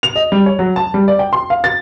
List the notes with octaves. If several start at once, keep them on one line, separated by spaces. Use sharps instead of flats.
F7
D#5
G3
C#5
F#3
A5
G3
D5
G5
C6
F5
A6